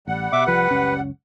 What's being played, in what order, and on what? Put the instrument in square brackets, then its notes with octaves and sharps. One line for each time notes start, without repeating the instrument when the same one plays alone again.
[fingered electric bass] A1 [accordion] G3 F#5
[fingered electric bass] B2 [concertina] E5 D6
[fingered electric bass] C2 F3 [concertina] B4
[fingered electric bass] F#1 C#2 C#4